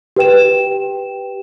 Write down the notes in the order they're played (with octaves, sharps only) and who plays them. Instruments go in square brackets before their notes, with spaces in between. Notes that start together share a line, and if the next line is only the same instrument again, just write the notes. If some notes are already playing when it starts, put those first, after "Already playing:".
[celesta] G4 B4 G5 E7